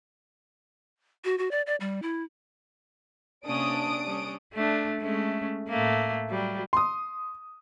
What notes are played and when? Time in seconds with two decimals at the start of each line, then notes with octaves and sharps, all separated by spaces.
1.24 F#4
1.38 F#4
1.51 D5
1.67 D5
1.80 G3
2.02 E4
3.46 C3 A#3 C#4 D4 D#6 D7
4.06 G3 C#4
4.53 A3 D4
5.00 G#3 A3 C#4
5.68 A2 A3 A#3
6.29 F#3 G3
6.73 C6 D#6